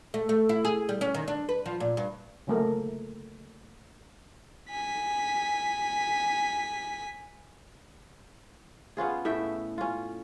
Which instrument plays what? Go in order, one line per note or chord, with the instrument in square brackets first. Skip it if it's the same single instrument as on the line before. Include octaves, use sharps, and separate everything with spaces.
[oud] A3
A3
E4
G#4
G3
C#4
D#3
D4
B4
F3
A#2
G2
[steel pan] C#3 F#3 A3 A#3 A#4
[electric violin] G#5 B6
[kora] B3 C#4 F4 G#4
A2 A3 E5 G5
C#4 F4